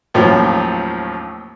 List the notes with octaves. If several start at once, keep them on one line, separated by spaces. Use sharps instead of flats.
D#2 A2 F3 F#3 C4 C#4